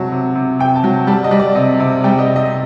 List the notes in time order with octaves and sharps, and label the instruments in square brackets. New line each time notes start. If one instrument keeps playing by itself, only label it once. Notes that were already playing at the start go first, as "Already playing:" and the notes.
Already playing: [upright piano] C3 F#3 A5
C3
C3
C3 G5
A5
F#3
G3 A5
D#5
G3
D5
C3 D#5
C3
G3 G5
D#5
C3
D#5
C3